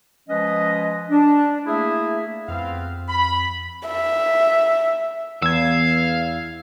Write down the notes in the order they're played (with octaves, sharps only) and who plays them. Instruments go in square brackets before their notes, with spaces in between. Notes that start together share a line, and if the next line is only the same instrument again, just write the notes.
[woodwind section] F3 G#3 C#4 B4 D#5
D4
A3 A#3 E4 G#4 E5
[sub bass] F2 [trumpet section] B3 C4 F5
[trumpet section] B5
[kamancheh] E5
[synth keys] E2 [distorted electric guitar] F5 [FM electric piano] E6 G#6